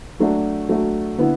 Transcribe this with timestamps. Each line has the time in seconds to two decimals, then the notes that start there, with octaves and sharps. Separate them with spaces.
0.19 F#3 A3 D4 F#4
0.69 F#3 A3 D4 F#4
1.18 D3 B3 E4